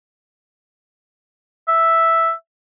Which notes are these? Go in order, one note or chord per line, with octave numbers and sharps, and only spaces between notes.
E5